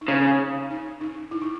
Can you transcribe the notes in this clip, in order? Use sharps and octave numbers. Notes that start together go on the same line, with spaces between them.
D#4
C#3 C#4
D#4
D#4
E4
D#4